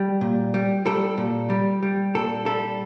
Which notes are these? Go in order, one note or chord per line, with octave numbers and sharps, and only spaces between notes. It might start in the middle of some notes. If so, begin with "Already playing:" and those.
Already playing: G3
A#2
G3
G3 A4
A#2
G3
G3
A#2 A4
G3 A4